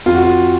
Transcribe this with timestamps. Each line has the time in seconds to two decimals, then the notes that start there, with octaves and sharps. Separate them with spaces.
0.06 F2 F4
0.15 F#4
0.23 F4